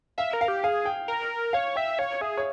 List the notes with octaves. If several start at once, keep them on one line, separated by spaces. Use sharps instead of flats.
E5 F5
A#4
F5
G4
G#4 F5
G5
A#4
C#5 F5
E5 G5
C#5 F5
G#4 E5
C#5